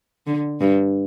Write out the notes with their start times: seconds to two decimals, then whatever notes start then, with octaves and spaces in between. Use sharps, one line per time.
0.26 D3
0.60 G2